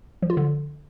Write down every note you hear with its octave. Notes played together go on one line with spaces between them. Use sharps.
F3
F4
D3